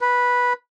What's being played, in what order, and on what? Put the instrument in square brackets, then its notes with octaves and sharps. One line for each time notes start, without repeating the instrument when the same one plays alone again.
[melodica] B4